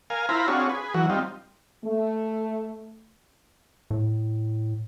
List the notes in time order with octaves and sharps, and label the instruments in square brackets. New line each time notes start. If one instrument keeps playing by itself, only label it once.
[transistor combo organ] A#4 F5 G#5
E4 F4 C5 A#5 B5
C4 D4 F4 F#4 G#4 C#5
G#4 B4
E3 F#3 F#4
G3 C4 D#4 F4
[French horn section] A3
[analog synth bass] A2